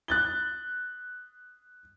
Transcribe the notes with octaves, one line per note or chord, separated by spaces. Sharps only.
F#6 A6 G7